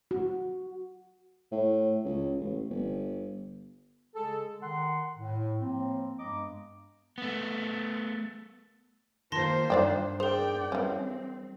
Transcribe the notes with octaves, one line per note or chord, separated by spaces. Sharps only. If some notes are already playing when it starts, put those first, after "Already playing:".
F#4
A2
C#2
A1
G1
C#3 G#3 G#4 A4
D#3 F#5 C6
A2
A2 F3 A#3 C4
G2 G#3 B3 D#5 A#5 D6
A3 B3
D#3 A#3 F4 C5 A5 C6 A#6
G2 D#4 D5 G5
G#4 A#4 C5 D5 G5
E3 G3 C4 C#4